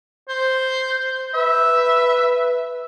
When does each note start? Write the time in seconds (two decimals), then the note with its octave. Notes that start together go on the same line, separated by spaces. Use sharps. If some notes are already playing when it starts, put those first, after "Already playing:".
0.29 C5
1.34 B4 E5